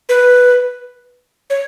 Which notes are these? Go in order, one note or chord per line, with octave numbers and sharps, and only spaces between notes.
B4
C#5